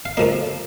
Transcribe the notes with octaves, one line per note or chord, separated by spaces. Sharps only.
F5
A2 F3 A#3 D#5